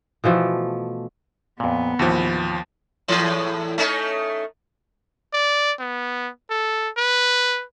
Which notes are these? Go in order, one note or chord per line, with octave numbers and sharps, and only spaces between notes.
B2 E3 F3 A3
F2 A#2 B3
D#2 A2 E3 F3 F#4
E2 A2 E3
A3 C#4 D#4
D5
B3
A4
B4